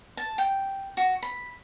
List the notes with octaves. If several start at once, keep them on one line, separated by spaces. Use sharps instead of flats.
A5
G5
F#4
B5